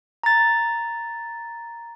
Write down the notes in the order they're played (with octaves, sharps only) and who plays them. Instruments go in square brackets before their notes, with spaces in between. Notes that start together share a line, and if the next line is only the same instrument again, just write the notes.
[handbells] A#5 A6